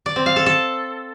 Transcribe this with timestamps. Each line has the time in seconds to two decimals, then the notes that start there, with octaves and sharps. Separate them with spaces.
0.06 D5
0.16 C4
0.26 F5
0.36 A4
0.46 A4